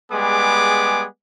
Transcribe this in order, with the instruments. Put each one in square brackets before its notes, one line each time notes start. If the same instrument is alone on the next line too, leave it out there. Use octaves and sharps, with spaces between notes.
[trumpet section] G3 G#3 B3 G#4 D6